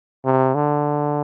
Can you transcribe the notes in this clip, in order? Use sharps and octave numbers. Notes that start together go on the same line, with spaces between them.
C3
D3